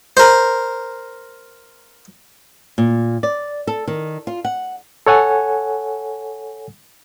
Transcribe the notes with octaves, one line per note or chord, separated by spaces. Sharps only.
A#4 C5
A#2
D5
A4
D#3
F4
F#5
A4 C#5 F#5 G#5